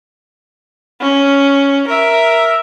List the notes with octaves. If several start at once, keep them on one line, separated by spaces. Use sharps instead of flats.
C#4
A#4 E5